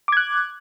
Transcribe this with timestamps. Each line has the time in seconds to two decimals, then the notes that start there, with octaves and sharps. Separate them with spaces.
0.08 D6
0.12 G#6
0.17 F#6